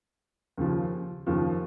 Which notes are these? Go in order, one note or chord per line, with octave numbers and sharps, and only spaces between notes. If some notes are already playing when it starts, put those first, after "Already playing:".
D#2 C#3 F3
D#2 C#3 F3